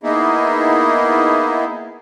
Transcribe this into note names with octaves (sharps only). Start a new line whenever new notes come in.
A#3 B3 D#4 E4 G#4